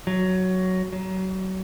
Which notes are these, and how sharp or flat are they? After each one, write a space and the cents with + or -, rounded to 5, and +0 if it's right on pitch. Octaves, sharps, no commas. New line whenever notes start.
F#3 +5
F#3 +30